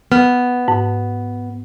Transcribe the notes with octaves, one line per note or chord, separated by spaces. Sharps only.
B3 F6
G#2